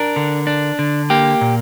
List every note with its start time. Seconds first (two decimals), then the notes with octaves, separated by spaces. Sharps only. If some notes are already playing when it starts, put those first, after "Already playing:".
Already playing: D4 A#4
0.16 D3
0.47 D4
0.79 D3
1.10 A#3 G4
1.41 A#2